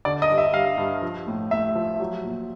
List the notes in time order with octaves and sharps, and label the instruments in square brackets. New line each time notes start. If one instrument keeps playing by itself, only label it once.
[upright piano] D3 D5
D#5
G2
E5
G3 F5
G2
F3
A2
A2 E5
F3
F#3
A#2